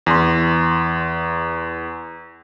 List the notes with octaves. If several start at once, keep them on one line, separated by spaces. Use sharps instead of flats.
E2 C6